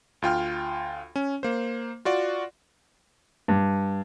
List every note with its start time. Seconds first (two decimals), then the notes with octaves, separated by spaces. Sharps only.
0.22 D2 F4 G5 F6
1.16 C#4
1.43 A#3 C5
2.05 F4 F#4 D5
3.48 G2